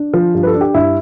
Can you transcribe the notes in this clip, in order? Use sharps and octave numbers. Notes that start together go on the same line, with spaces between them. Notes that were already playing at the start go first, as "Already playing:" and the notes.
Already playing: D4
F3
G2
B4
A4
D4
G4
G2 E4